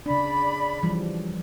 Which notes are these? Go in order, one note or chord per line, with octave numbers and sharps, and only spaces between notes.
C#3 D4 D5 B5
E3 F3 G3